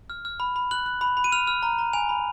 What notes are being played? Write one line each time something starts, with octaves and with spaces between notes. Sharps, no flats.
F6
F6
B5
B5
F#6 F#7
F#6
B5
B5
D#7
F6 F7
F6
A#5
A#5
G#5 F7
B5